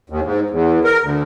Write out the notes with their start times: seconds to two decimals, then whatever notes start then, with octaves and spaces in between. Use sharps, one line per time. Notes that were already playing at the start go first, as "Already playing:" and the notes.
0.10 D#2
0.24 G#2
0.50 E2
0.84 A#4
1.02 D2